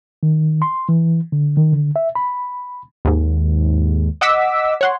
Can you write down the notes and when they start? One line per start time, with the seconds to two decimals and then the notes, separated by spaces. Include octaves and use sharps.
0.23 D#3
0.62 C6
0.89 E3
1.32 D3
1.57 D#3
1.72 D3
1.96 E5
2.15 B5
3.05 D#2 G#2
4.21 D#5 F#5 D6 E6 B6
4.81 C#5 F#5 C6